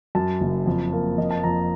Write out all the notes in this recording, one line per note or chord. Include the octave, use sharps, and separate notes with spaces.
F#2 A5
F#1
F2
A#3
F2 D#5
A5
F2 A#5